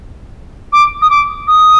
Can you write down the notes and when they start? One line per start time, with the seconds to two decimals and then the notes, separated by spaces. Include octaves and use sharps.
0.73 D6
1.02 D#6
1.10 D6
1.47 D#6